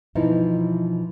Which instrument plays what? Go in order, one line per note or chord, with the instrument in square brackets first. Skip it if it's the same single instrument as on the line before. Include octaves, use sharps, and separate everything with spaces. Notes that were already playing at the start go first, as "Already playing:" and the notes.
[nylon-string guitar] B2 E3 F3 D#4 E4